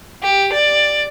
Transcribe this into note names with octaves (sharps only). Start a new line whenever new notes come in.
G4
D5